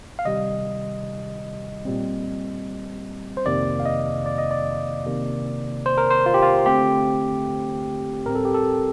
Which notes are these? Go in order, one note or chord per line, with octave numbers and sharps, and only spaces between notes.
F5
C3 D#3 G3 D#5
A#2 G3 C4
C5
F2 C3 D#3 A#3 D5
F5
D#5
D5
D#5
D5
C3 D#3 A#3
C5
A#4
C5
F4
G4
F4
D3 A3 C4 G4
A2 G3 C4 A#4
A4
G4
A4